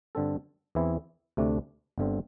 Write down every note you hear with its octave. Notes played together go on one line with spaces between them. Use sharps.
G2 D3 C4 A4
E2 E3 C4 E4
D2 C3 A3 D4
G1 G2 D3 C4